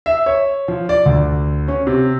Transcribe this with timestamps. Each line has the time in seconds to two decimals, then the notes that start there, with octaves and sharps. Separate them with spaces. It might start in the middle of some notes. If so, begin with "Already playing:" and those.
0.06 E5
0.26 C#5
0.68 F3
0.89 D5
1.06 D2
1.68 C#4
1.87 C3